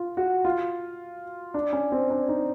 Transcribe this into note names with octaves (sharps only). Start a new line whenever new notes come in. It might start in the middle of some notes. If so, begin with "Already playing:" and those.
Already playing: F4
F#4
F4
D4
C#4
C4
D4
D#4